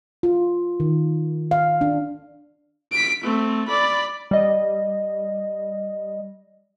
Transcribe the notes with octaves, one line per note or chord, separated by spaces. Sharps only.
F4
D#3
F5
D4
B6 D7
A3 C4
D5 B5
G3 D#5